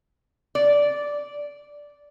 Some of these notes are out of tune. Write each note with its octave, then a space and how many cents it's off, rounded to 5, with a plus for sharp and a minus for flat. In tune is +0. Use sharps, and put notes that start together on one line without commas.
D5 -10